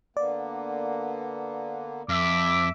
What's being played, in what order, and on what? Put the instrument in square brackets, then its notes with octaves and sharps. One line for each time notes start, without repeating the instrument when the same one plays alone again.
[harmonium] D3 A#3 B3 [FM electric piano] D5
[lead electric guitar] F2 [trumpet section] E5 D6